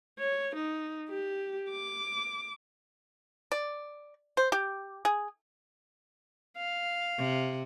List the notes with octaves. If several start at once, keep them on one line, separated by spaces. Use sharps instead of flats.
C#5
D#4
G4
D6
D5
C5
G4
G#4
F5
C3